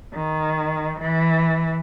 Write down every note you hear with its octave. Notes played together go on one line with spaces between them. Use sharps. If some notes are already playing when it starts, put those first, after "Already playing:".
D#3
E3